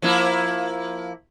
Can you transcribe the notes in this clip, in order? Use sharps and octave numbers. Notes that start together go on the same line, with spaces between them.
F3 A#3 E4